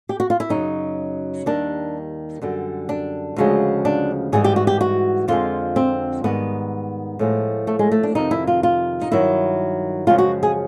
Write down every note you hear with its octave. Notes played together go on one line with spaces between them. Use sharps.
G4
F#4
F4
E4
F#2 C#3 F#3 D#4
D#2 D#3 G3 D4
F#2 D3 G3
D4
D2 C#3 F3 G#3
D4
G#2 E3 G3 G#4
G4
F#4
G4
F#4
F2 D3 F3 G#3 F4
C4
G#2 D#3 G3 B3
A2 F3 G#3
A3
G#3
A3
D4
F2 C3 D#3 D#4
E4
F4
F4
D#4
G2 D#3 F#3 E4
F#2 C#3 F3 G#3 F4
F#4
G#4